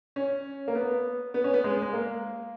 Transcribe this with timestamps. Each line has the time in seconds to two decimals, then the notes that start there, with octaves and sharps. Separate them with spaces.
0.16 C#4
0.68 A#3
0.75 B3
1.34 B3
1.44 C#4
1.54 B3
1.64 G#3
1.82 G#3
1.93 A#3